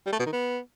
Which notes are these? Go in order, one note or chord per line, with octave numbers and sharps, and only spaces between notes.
G3
A3
B2
D#3
B3